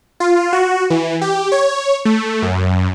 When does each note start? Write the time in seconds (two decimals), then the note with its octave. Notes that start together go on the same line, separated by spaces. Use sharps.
0.20 F4
0.53 F#4
0.90 E3
1.21 G4
1.52 C#5
2.05 A3
2.42 F#2